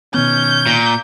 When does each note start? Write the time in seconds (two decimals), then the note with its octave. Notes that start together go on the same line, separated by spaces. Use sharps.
0.14 B2 D#3 B3 C#4 G6
0.66 A#2